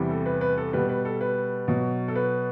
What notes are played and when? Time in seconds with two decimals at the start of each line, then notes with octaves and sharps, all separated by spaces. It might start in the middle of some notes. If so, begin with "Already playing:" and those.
Already playing: E2 C3 E3 G3
0.10 A4
0.26 B4
0.41 B4
0.57 A4
0.73 B2 G3 B4
0.89 B4
1.05 A4
1.21 B4
1.68 B2 F#3
2.08 A4
2.15 B4